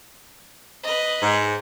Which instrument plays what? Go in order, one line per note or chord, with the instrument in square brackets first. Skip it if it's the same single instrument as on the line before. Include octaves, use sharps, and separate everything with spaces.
[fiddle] B4 D#5
[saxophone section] G#2